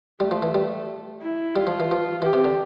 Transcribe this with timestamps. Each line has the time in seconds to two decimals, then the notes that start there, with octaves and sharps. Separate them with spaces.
0.20 G3 A3
0.31 F3
0.42 E3
0.54 G3
1.22 E4
1.55 G3 F4
1.67 F3
1.80 E3
1.91 F3
2.22 E3 G4
2.33 C3
2.44 D3